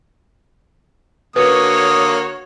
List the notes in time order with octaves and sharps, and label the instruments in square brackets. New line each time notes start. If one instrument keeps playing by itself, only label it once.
[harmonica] D3 A#3 D#6 [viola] F#4 C#5 [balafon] B4